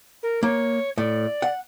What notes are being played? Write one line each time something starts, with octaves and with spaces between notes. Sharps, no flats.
A#4
A#3 C#5
A2 D5
F#5